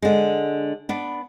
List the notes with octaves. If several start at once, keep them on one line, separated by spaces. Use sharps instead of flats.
D3 G#3
B3 D4